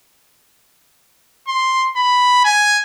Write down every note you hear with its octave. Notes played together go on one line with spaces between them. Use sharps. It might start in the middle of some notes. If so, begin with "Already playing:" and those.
C6
B5
G#5